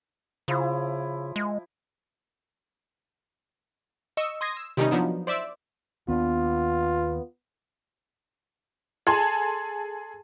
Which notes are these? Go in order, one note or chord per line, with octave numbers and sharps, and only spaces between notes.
C#3 F3 E4
G#3
D#5 C#6 E6
C6 D#6 G#6 A#6 C7
E6
C3 D#3 G3 C#4 D#4
F3 F#3 B3 D4 D#4
C5 D5 E5 D6 E6
D#2 B3 C#4 D4 F4
G#4 A4 G#5 A5 C6